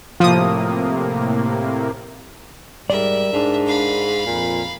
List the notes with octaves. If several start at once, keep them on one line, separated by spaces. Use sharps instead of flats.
A2 C3 F3 A#3 D#6
G#2 G3 A#4 D5 E5
G#2 D4
F5 B5
F2 A#2